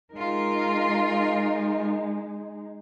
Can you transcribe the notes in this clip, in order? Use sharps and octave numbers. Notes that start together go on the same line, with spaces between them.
G#3 D#4 F4 A#4